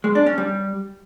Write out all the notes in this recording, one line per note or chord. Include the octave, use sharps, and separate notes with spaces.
G#3
D4
C#4
G3